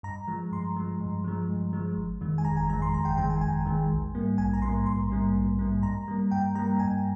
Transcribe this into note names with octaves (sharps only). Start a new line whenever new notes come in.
G2 A#5
F3 G#3
G2 C6
F3 G#3
G2
F3 G#3
G2
F3 G#3
G1
F2 D#3 G#3
G#5
G1 A#5
G#5
F2 D#3 G#3 A#5
C6
G1 A#5
G5
F2 D#3 G#3 G5
G#5
G1 G#5
F2 D#3 G#3
A#1
G#2 G3 A#3
A#1 G#5
A#5
G#2 G3 A#3 C6
A#1 C6
G#2 G3 A#3
A#1
G#2 G3 A#3
G2 A#5
G3 A#3
G2 G5
G3 A#3 A#5
G2 G#5